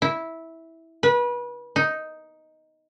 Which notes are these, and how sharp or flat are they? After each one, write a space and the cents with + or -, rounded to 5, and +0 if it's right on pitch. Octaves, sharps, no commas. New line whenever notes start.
E4 -10
B4 -30
D#4 +5